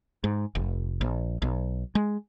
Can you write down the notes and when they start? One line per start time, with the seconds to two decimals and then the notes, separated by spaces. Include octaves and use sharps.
0.24 G#2
0.55 F1
1.01 A#1
1.42 B1
1.95 G#3